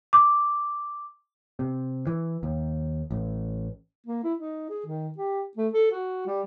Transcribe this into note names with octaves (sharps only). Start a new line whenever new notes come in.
D6
C3
E3
D#2
A1
A#3
E4
D#4
G#4
D#3
G4
A3
A4
F#4
G3